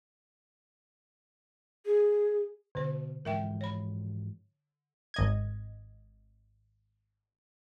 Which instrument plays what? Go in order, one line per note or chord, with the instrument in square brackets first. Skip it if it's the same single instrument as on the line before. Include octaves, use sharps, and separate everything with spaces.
[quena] G#4
[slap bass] B2 [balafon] D3 C5
[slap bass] G#2 E3 F3 [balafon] A#4 E5 G5
[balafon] C#5 B5
[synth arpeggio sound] G#1 D#5 G#6